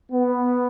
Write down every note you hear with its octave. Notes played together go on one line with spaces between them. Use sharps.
B3